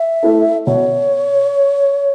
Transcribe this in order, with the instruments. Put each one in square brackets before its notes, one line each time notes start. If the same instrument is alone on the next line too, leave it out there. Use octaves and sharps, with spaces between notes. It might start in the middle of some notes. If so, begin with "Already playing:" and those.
Already playing: [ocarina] E5
[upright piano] A3 E4 A4
[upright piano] B2 [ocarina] C#5